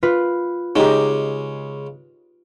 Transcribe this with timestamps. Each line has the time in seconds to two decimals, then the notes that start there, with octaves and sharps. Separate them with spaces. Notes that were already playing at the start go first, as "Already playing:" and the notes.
0.03 F4 B4
0.76 C#3 G#3 D#4 G4